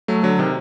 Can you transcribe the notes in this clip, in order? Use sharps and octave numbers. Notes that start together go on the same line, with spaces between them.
F#3 A3
D3 F#3
C3 D#3